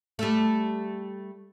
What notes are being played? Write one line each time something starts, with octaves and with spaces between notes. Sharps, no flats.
G3 A3